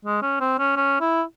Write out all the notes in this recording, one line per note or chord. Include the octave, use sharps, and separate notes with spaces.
G#3
C#4
C4
C#4
C#4
E4